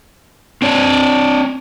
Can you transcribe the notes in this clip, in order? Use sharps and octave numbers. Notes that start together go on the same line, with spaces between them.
C4 D4 C#5